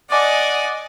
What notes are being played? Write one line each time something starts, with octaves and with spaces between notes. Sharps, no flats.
D5 D#5 F#5 G#5